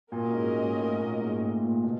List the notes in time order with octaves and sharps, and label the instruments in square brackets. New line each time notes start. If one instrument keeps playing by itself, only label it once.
[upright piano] A#2 [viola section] C#4 F#4 A#4 D#5
[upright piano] G#2
G#2
A2
A#2
G#2
A2
A#2
B2